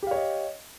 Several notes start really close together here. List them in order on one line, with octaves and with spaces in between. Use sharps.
G4 F5 C#5 D#5